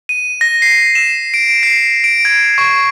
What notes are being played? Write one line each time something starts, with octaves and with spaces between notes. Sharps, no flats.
D#7
A#6
C7
E7
D7
C7
D7
G#6
C#6